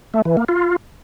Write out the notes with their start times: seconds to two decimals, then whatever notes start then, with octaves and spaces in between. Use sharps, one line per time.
0.14 A3
0.25 E3
0.37 A#3
0.49 F4